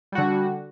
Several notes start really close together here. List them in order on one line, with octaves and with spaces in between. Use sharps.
G3 F#4 D3